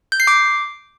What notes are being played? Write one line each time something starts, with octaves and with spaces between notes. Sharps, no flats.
G6
C7
D6